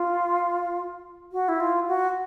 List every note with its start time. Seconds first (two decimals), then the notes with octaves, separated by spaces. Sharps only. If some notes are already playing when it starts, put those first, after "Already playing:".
Already playing: F4
1.32 F#4
1.48 E4
1.60 F4
1.88 F#4